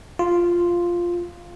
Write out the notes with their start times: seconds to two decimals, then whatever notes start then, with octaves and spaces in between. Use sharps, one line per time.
0.19 F4